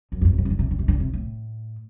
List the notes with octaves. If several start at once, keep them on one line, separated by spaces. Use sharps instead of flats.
F#2
A2
G2
C3
B2
C3
D3
C3
D3
C3
D3
C3
A2